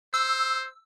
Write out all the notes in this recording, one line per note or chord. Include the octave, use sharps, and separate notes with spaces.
C5 E6